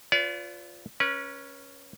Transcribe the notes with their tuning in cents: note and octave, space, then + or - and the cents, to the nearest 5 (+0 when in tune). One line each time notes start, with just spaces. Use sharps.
F4 +0 B4 +30 D5 -40
C#4 +0 B4 -35